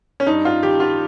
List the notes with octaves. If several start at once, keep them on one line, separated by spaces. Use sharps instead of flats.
C#4
G2 D#4
F4
D#3 G4
F4